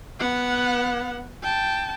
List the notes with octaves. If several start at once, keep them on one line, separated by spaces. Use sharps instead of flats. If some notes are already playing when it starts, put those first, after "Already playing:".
B3 F#5
G5 A5